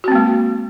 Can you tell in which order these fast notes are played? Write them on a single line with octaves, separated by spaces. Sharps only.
F#4 C4 A#3 G#3